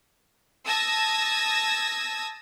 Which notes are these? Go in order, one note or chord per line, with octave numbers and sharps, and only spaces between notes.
A5 D#6 E6 G#6 A#6